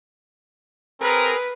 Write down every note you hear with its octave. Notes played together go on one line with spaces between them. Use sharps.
C4 G#4 A#4 B4